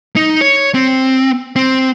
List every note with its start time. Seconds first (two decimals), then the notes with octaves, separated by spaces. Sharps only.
0.16 D#4
0.41 C#5
0.74 C4
1.56 C4